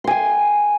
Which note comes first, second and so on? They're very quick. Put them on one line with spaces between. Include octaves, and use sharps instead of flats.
C6 G#5 G5